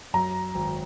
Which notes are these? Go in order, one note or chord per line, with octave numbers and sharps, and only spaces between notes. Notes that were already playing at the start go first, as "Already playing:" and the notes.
F#2 A#5
G#1